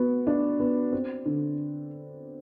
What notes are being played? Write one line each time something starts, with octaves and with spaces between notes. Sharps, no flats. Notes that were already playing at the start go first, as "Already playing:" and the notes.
Already playing: B3 F#4
D4
B3
C4
D3